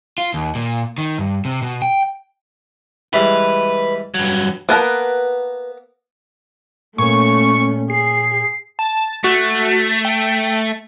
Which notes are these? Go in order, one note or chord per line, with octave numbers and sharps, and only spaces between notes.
F4
D#2
A#2
D#3
G2
C3
B2
G5
E3 G3 G#3 B4
G2 F#3
A#3 B3 A#4 B4 A5
A#2 A3 C#4 C#5 C#6
G#4 C7
A5
A3 F#4
G5